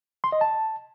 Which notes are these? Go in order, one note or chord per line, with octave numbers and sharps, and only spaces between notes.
C6
D#5
A5